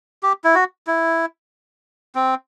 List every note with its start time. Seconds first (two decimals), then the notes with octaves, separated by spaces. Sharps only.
0.23 G4
0.44 E4
0.55 F#4
0.87 E4
2.15 C4